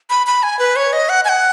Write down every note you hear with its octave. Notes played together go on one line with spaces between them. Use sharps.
B5
B5
G#5
B4
C#5
D#5
F#5
G#5
F#5